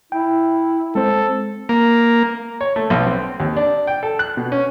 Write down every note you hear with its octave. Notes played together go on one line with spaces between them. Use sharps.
E4 G5
G#3 C4 A4 C5
A#3
C#5
A3
B1
C4
D#2
D4
G5
A4
F#6
B2
C#4